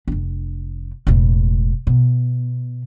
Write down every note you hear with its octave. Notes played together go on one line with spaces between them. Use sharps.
F1 D4
E1 A2
B2